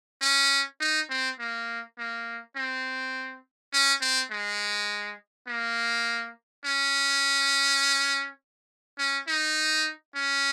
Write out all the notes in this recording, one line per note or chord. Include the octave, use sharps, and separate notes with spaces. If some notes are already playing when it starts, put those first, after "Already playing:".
C#4
D#4
C4
A#3
A#3
C4
C#4
C4
G#3
A#3
C#4
C#4
D#4
C#4